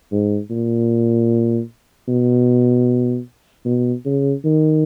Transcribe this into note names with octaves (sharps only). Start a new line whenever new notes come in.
G#2
A#2
B2
B2
C#3
D#3